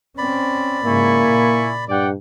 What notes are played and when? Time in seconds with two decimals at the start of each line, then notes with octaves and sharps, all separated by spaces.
0.18 C4 C#4 D5 B5
0.85 G#2 C#3 A#3 E4 G#5 C#6
1.25 A#2
1.89 G2 D5 F#5 G5